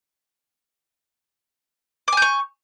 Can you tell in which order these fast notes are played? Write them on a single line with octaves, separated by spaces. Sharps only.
D6 G#5 G6 C#6